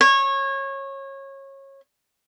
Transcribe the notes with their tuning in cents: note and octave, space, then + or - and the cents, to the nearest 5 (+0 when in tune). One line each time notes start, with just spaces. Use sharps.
C#5 -25